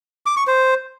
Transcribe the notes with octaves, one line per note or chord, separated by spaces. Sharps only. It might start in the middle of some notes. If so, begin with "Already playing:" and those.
D6
C#6
C5